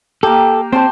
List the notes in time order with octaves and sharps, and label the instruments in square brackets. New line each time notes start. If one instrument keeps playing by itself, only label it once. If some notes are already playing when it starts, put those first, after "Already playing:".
[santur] A#3 G4 [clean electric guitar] A4
[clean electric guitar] C4 [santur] C5 A5 C6